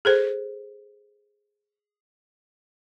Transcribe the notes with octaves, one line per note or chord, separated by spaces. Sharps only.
G#4 A4 C5